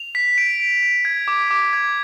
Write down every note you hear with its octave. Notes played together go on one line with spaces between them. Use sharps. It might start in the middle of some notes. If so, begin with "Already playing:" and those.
Already playing: F7
B6
D7
D7
D7
G#6
D6
D6
G#6